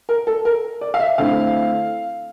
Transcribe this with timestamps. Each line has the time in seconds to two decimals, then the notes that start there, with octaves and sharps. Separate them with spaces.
0.09 A#4
0.27 A4
0.45 A#4
0.81 D5
0.94 F5
0.99 E5
1.18 D3 A3 C4 E4 F5